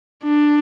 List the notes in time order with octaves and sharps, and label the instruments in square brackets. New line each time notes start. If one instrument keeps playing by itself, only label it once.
[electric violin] D4